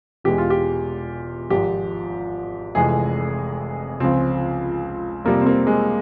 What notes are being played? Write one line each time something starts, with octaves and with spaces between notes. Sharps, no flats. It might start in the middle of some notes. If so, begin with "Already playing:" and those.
E1 E2 E3 G#3 G4
F4
G4
G#1 G#2 F3 G4
F1 F2 C3 E3 G#3 G#4
C#2 C#3 F3 C4
F2 C3 G3 A#3
C4
A#3
G#3